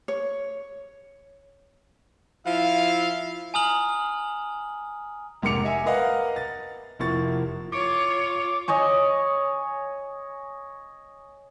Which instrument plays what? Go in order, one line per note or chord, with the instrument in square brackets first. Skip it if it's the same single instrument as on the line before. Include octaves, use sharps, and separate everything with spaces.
[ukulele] C#5
[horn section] F3 E4 E5 F5
[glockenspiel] G#5 A#5 D#6 F6 F#7
[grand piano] F1 G#2 A#3 D6 C#7 F7
D#5 E5 G#5
A#4 B4 D#5 F5 F#5
A6
F1 F3 A#3 E4 C#6 A6
[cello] F4 C#5 [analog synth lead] D6
[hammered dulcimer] C#5 D#5 G#5 C#6